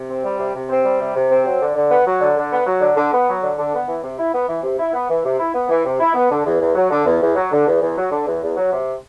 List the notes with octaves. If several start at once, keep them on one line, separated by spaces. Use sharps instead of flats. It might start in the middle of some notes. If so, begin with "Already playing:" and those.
Already playing: C3
C4
G3
C3
C3
C4
G3
C3
C3
C4
F#3
D3
D3
B3
F#3
D3
D3
B3
F#3
D3
D3
B3
F#3
D3
D3
B3
E3
C3
E4
B3
E3
C3
E4
B3
E3
C3
E4
B3
E3
C3
E4
B3
D3
E2
E2
F#3
D3
E2
E2
F#3
D3
E2
E2
F#3
D3
E2
E2
F#3
C3